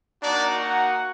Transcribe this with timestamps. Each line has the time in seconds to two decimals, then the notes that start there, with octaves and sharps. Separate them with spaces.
0.22 A#3 D4 D#4 F#4 D5
0.58 F#4 F#5